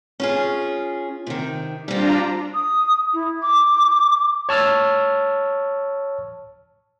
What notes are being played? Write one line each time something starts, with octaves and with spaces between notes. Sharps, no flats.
C#4 F4 G#4
C3 D#3
G3 C4 D4 F4 A#5
D#6
E4
D6
C#5 A5 E6 F6 A6